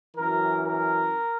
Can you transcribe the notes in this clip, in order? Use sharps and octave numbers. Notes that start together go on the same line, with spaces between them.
F#2 E3 A#4
A#4